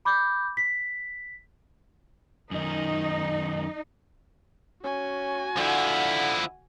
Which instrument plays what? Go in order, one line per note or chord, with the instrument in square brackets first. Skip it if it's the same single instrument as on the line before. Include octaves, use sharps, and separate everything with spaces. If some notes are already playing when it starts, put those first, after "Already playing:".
[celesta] B5 D6 G6
B6
[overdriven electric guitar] F#2 D#3 [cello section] D#4
[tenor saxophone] C#4 [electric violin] F#4 G#5
[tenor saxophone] D3 [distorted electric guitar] F3 E4 [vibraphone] F#5